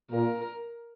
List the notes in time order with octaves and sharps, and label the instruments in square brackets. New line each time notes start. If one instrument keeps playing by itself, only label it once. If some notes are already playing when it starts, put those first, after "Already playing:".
[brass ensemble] A#2 [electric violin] A#4